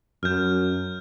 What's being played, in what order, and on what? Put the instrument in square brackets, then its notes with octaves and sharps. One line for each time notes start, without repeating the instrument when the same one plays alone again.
[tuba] F#2 [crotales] F6 G6